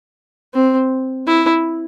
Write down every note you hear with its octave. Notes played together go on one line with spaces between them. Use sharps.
C4
E4